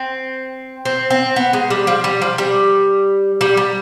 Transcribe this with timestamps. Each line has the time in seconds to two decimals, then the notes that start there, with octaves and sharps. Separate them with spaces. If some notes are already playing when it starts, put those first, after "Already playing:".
Already playing: C4
0.85 C4
1.10 C4
1.36 B3
1.53 G#3
1.70 G3
1.87 F3
2.04 G3
2.22 F3
2.38 G3
3.41 G3
3.57 G3